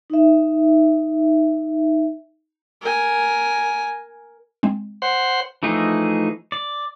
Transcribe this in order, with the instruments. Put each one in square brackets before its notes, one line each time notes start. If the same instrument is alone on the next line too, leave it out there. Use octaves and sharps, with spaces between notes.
[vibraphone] D#4 E5
[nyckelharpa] A#4 G#5
[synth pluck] G#3 C4
[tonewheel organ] C5 F#5 C6
[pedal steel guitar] E3 F3 A3 D#4 G#4
D5